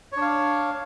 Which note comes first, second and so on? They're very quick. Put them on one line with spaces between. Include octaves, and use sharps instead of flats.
C#5 D4 F5